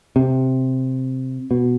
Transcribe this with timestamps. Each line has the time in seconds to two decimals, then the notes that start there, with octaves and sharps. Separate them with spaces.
0.16 C3
1.51 B2